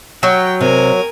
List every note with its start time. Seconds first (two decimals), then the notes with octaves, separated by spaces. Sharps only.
0.23 F#3 G5
0.60 C3 A#4 G#5